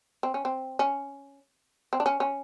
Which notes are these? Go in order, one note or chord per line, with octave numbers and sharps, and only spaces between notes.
C4
C#4
C4
C#4
C4
D4
C#4
C#4